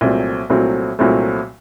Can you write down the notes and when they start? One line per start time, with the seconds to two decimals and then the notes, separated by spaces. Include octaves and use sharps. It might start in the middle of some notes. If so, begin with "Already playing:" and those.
0.01 C2 A#2 F#3 A3 C4
0.50 C2 A#2 F#3 A3 C4
0.99 C2 A#2 F#3 A3 C4